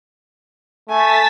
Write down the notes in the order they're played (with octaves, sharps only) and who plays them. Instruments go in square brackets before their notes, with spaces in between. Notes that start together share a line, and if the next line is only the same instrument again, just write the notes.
[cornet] A3 [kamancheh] G#5 [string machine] A5 A6 B6